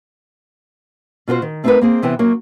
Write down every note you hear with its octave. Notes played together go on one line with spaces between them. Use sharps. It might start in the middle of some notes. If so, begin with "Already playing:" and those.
B2 F4 F#4 C5
D#3
A3 C4 D#4 G4 A#4 B4
A#3 C4 G#4
C3 E3 B3 G5
F#2 F#3 A#3